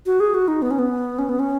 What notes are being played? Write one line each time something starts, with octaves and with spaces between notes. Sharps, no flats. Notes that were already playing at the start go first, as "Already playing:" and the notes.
F#4
G#4
F#4
D#4
B3
C#4
B3
C#4
B3
C#4